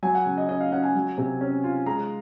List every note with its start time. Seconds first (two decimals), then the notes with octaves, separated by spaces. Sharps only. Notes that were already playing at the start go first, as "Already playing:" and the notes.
0.03 F#3 G#5
0.15 F#5
0.26 C#3
0.37 D#5
0.49 C#4 D#5
0.61 F5
0.72 C#4 F#5
0.83 G#5
0.95 F#3
1.18 C3
1.41 C#4
1.64 F4
1.86 G#3 A#5